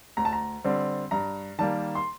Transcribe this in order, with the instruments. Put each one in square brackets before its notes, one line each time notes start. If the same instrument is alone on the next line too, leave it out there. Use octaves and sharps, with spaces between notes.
[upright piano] D2 A#5
A5
A#5
D3 G3 C4
G2 A#5
D#3 G3 A#3 A5
C6